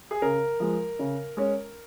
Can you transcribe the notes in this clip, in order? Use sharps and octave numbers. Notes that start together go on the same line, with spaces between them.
G#4
C#3 A#4
F3 G#3
C#3
G#3 C#4